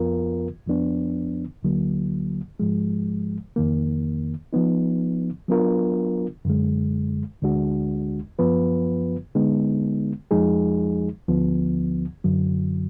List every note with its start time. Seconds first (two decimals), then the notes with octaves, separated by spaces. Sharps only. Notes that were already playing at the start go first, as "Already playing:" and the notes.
Already playing: F2 F3 B3 F4 A#4
0.67 F2 F3 B3 D4
1.63 D2 D3 F#3 A#3
2.60 G#2 F3 G#3
3.56 F2 D#3 A#3
4.53 F3 B3 D#4
5.48 F#3 B3 D4 F4 A#4
6.45 F#2 D3 G#3
7.42 D2 D3 G#3 D4 F#4
8.39 F#2 F3 B3 F4 B4
9.35 D3 G#3 B3 D#4
10.31 F2 F3 G#3 D#4 G#4
11.28 D2 D3 F3 B3
12.24 F#2 D3 F#3